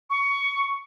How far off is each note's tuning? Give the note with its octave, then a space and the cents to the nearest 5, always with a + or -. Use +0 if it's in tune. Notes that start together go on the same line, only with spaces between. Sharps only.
C#6 +15